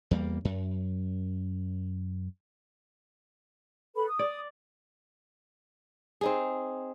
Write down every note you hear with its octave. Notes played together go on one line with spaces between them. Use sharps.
E2 G3 A#3
F#2
A4 B4 B5
D#6
D5
C4 D#4 G#4